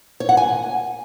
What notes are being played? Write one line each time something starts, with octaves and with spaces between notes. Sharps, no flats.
C#5
F#5
G#5